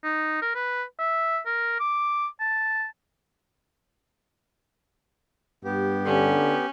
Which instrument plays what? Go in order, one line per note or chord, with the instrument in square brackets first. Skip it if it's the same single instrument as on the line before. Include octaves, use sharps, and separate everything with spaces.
[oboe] D#4
A#4
B4
E5
A#4
D6
A5
[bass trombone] G2 [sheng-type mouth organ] B3 G4
[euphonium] D3 [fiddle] C#4